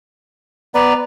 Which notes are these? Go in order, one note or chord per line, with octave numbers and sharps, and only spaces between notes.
B3 B4 D5 A#5